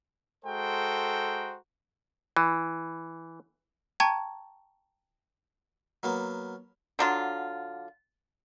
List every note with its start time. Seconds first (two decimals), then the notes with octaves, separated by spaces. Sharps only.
0.45 G#3 F#4 A4 C5 G5 A#5
2.37 E3
4.00 G5 A5 A#5 C#6 G#6
6.03 F#3 A#3 B3
6.99 D3 F#3 F4